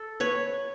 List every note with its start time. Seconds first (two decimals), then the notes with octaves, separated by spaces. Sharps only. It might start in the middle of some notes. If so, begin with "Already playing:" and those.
Already playing: A4
0.20 B4 C#5